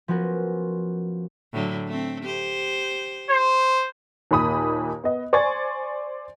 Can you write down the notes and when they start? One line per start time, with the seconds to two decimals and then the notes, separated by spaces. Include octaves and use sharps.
0.08 F3 B3 C#4 F#4 A#4
1.53 A2 D3 F#3
1.88 A3 C4
2.24 G4 C5
3.30 C5
4.31 D#2 A#2 B5 D#6
5.04 B3 D#5
5.33 C5 D5 G#5 C#6 G#6 A6